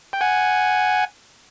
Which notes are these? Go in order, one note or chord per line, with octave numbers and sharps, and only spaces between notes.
G5
F#5 G#5